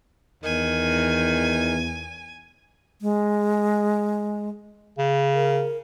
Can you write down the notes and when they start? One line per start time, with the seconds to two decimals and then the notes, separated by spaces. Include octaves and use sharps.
0.44 E2 D#3 G#5
3.02 G#3
4.98 C#3
5.34 A#4